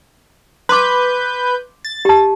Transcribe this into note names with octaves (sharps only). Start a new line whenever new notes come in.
B4 C6 D6 G6
A6
G4 A5